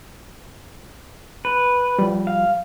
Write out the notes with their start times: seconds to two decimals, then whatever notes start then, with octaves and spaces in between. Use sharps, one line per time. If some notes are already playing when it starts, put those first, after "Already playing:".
1.45 B4
1.99 F3 G3
2.27 F5